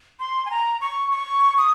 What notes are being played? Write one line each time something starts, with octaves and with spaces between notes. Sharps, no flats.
C6
G#5
A#5
C#6
C#6
D#6